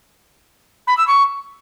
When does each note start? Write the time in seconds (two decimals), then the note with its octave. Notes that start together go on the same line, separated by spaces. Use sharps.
0.87 B5
0.97 E6
1.07 C#6